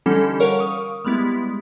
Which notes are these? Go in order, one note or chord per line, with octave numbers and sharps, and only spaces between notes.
D3 E3 G3 C#4 D#4 A4
A#4 C#5 F5 F#5 C#6
F5 C#6 D#6
G3 G#3 B3 E4